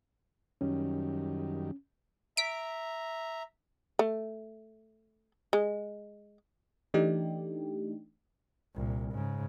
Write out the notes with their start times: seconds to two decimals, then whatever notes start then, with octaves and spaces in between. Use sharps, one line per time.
0.61 F#2 D#3 G3 C#4
2.37 E5 A#5 B6 D7
3.99 A3
5.53 G#3
6.94 E3 A3 D4 D#4 G4
8.75 C2 A#2
9.12 G#2 C#3